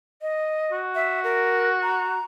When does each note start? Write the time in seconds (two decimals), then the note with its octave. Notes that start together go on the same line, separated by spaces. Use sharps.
0.22 D#5
0.72 F#4
0.95 E5
1.24 A#4
1.83 A#5